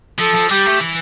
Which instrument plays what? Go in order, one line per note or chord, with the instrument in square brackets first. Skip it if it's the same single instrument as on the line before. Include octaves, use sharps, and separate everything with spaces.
[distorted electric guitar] F3 [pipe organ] A4
[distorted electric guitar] F3
[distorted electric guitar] G3 [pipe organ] G4
[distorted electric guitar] A3
E3